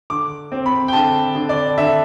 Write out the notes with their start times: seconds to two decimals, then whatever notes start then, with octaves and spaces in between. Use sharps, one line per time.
0.10 D3 D6
0.52 C4
0.66 B5
0.88 G5
0.93 D3 A5
1.35 D3
1.49 D5
1.78 D3 E5